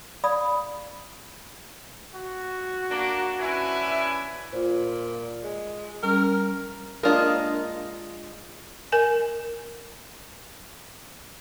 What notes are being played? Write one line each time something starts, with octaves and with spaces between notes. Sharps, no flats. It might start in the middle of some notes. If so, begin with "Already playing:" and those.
D5 F5 B5 D#6
F#4
A#3 D4
C#4 D4 E4 B4 G#5
A#2 F4 C5
G#3
G3 C#4 A#4
G#3 A#3 D4 F4 A#4 D#5
A#4 G#5